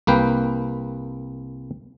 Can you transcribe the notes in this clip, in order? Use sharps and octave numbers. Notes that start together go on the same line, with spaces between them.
C2 A#3 B4 G5